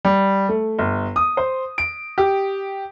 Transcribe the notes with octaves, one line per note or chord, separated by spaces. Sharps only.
G3
A3
G1
D#6
C5
D7
G4